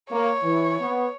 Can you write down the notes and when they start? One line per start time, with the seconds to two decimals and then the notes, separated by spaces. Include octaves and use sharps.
0.10 A#3 C#5
0.43 E3
0.81 B3